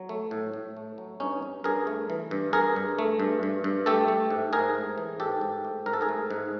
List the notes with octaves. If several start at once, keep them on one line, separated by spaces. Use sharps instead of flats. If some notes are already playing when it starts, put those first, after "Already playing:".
Already playing: F#3
A3
A2
A2
A3
F#3
G2 C#4 D#4
G2
G2 G#4 A#4
A3
E3
G2
G2 G#4 A#4
G2
A3
G2
G2
G2
A3 G4 A4
A3
G#2
G#2 G#4 A#4
A3
E3
G#2 G4 A4
G#2
A3
G#2 A#4
A4
G#4 A#4
A3
G#2